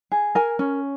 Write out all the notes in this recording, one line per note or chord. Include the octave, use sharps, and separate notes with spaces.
G#4
A#4 G#5
C#4